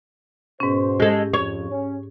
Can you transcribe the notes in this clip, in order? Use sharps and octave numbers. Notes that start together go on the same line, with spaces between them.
G#2 B2 C#4 C5
G#3 G4 A4
F2 C#5
C#4